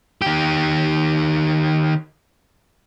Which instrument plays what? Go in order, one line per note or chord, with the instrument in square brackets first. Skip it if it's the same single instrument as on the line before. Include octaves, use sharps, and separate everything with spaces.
[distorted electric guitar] D#3 G4